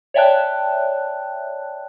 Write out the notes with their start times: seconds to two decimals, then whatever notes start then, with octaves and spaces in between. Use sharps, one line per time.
0.14 C#5 D5 E5 G5 A5 F#6